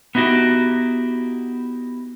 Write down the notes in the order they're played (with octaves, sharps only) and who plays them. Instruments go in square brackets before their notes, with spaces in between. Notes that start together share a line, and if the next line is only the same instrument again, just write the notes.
[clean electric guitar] B3 D#4 E4 F#4 G4